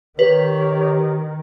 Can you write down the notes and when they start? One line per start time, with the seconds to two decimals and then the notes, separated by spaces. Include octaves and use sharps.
0.19 D#3 G4 B4 C#5